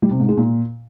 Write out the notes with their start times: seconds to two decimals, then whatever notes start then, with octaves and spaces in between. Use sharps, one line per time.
0.02 G3
0.11 C3
0.20 G#2
0.29 G#3
0.37 A#2